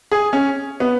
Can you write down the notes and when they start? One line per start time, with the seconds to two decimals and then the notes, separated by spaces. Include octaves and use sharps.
0.12 G#4
0.33 C#4
0.80 B3